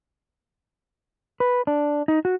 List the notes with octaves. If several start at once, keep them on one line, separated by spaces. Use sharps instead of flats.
B4
D4
D#4
F#4